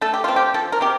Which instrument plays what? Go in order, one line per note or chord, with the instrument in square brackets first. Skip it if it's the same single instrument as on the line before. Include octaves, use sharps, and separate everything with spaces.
[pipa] A3 A4
G4
C4 F4
G4
F3 A4
A#4
C3 G4